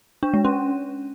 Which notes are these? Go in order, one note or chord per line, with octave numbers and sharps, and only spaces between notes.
D4
G#3
C#4